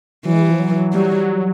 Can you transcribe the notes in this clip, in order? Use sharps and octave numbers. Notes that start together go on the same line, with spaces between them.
E3 F#3
G#3
G3
F3
F#3
G3